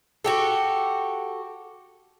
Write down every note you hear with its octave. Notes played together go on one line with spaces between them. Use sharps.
F#4 G4 A4